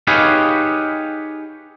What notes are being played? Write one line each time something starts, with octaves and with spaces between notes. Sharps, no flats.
D#4 G4 G#4 B4 C#5 F5